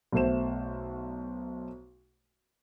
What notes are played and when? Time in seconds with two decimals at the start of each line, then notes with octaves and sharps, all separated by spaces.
0.12 B1 B2 A3 C5 E7